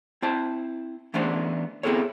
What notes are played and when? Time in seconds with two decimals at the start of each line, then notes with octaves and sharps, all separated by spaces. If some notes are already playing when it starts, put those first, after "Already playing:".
0.22 C4 E4 C5 A5
1.14 E3 A3 B3 C#4 D4 C5
1.83 B3 C4 E4 G#4 A4 C#5